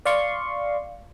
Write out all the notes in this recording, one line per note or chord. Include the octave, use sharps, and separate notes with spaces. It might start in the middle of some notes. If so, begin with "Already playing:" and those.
D5 F5 C6 C#6